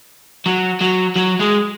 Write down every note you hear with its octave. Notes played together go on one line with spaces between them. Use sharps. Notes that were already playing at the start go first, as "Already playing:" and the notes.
F#3
F#3
F#3
G#3